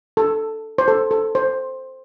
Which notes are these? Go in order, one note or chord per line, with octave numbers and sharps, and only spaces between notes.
A4
C5
A4
A4
C5